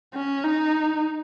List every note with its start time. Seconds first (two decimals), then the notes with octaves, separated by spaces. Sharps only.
0.14 C#4
0.44 D#4